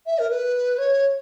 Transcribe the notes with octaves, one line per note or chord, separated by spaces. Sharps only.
E5
A#4
B4
C#5